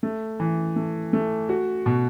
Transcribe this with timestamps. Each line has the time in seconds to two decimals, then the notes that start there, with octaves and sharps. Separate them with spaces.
0.03 A3
0.40 E3
0.76 A3
1.13 A3
1.49 F#4
1.86 B2